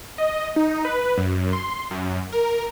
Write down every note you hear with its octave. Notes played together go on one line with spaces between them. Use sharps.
D#5
D#4
B4
F#2
C6
F#2
A#4